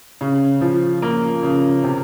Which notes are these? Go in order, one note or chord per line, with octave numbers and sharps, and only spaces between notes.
C#3
F3
A#3
C#3
C3